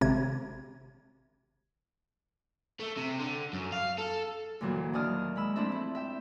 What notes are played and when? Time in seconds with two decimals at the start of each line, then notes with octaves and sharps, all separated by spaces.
0.01 G#1 C3 G#6
2.80 A3
2.97 C3
3.20 D3
3.53 F#2
3.72 F5
3.98 A4
4.61 D2 A#2 E3 F#3 A#3
4.93 D#2 D4 D5 D#6 F6
5.36 G#3 B5 E6
5.56 F2 A3 C4 D4 E4 E5
5.72 E4
5.95 E5 G5